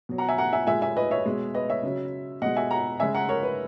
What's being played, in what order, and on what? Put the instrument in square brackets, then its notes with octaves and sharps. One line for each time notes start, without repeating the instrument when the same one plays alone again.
[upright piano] B2 F#3
F#5 A#5
E5 G#5
F#5 A#5
E5 G#5
A#2 G#3 E5 G#5
E5 G#5
B4 D#5
C#5 E5
B2 G#3
B4 D#5
C#5 E5
C#3 F#3
B2 G#3 D#5 F#5
E5 G#5
F#5 A#5
C#3 G#3 E5 G#5
F#5 A#5
A#4 C#5
B4